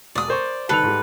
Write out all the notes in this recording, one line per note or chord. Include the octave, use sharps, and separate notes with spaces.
E1 D5 D#6
A#4 C5 C#6
C2 D#3 A4 B4 F7
G#2 G3